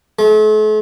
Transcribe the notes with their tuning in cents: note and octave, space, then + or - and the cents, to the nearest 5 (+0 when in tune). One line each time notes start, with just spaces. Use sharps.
A3 -45